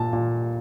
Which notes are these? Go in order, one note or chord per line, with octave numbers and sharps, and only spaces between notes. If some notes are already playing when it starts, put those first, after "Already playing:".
Already playing: A#2 A5
A#2